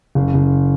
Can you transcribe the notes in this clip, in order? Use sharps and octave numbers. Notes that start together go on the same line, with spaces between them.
F#1
F#1